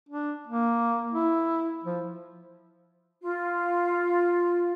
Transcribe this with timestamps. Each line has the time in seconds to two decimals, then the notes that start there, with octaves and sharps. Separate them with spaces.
0.09 D4
0.47 A#3
1.11 E4
1.84 F3
3.22 F4